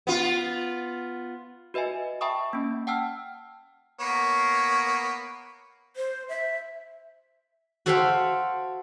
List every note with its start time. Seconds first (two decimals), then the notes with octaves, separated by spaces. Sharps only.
0.07 B3 F4
1.74 F#4 B4 D#5 E5 G#5
2.21 E5 G5 A5 B5 C#6 D#6
2.53 A#3 C#4
2.87 F#5 G5 A5 E6 F6
4.00 A#3 B3 C#5
5.96 C5
6.29 E5
7.86 F#4 A4 C5 E5 F5 G5